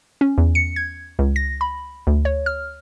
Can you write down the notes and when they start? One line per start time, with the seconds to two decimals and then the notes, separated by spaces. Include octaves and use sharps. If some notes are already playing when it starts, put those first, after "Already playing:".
0.21 C#4
0.38 E2
0.55 C#7
0.76 G#6
1.19 C#2
1.36 A#6
1.61 B5
2.07 D2
2.25 C#5
2.46 F6